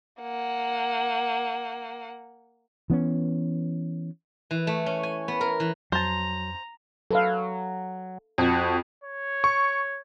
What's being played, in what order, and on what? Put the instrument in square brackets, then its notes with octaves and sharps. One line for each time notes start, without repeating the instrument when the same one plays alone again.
[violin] A#3 F#5
[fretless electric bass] E3 B3 C#4
[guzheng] E3
A3
C#4
G#5
B3
A#4
E3
[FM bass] F2 [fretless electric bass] F#3 [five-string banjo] C5 A5 [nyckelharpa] A#5
[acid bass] F#3 [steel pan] A4 B4 F5
[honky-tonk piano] F2 [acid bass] F#4
[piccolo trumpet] C#5
[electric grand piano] C#6